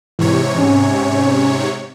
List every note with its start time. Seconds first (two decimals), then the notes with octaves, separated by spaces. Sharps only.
0.19 G#2 C3 E3 C#5
0.58 C#4 G#5